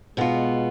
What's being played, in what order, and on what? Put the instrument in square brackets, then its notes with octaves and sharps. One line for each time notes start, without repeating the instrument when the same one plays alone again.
[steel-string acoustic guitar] B2 B3 F4 [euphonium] G#3